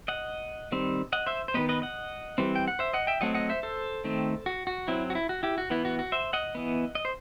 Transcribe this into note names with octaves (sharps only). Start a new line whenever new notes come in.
D#5 F#5
D#3 G3 C4
D#5 F#5
C5 E5
C5
D#3 G3 B3 B4 D#5
B4 D#5
D#5 F#5
E3 G3 C4
G5
F#5
C5 E5
D#5 F#5
E5 G5
F#3 A3 C4 D#5 F#5
D#5 F#5
C5 E5
A4 C5
D#3 A3 C4
F#4
F#4
F#3 C4 E4
F#4
E4
F#4
E4 G4
F#4
E3 B3 E4
F#4
F#4
C5 E5
D#5 F#5
E3 B3
D#5
C5